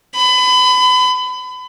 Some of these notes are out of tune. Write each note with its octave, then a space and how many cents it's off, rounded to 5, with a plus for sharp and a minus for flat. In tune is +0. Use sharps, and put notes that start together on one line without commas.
B5 +30